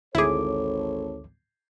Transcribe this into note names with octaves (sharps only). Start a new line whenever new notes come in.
G#1 D2 E4 G#4 A4 C#5 D6